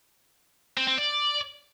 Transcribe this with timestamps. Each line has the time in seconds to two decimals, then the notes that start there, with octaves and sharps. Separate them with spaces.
0.77 C4
0.88 C4
0.98 D5